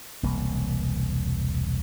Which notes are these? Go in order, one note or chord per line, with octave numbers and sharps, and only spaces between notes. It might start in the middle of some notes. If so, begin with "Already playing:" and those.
E1 C2 A#3